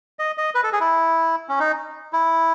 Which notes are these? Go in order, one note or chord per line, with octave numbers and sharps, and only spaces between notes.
D#5
D#5
B4
A4
G#4
E4
C#4
D#4
E4